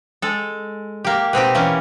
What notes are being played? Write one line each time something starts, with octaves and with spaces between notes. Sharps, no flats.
G#3 A4
A#3 G4
B2 C4 D#4 G4
E3 A#3 C#4